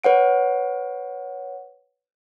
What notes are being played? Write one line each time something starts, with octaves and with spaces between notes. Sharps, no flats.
B4 C#5 F#5 D7